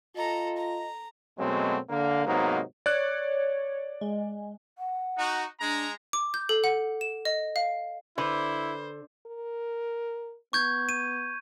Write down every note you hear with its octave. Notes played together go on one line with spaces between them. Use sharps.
F4 A4 D#5 A#5
A#5
F#2 B2 F#3 G#3 A3 C4
D3 A#3
G#2 C3 F#3 A#3 B3 D#4
C#5 D5 F#6
G#3
F#5
D#4 F#4
G#3 D4 A#5
D6
G6
A4
F#5
E7
D#5
F5
D3 E4 B4 C5
A#4
B3 C#6 G6 G#6
D#7